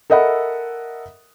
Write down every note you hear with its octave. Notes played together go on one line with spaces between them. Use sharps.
A4 A#4 D#5 E5 F#5 B5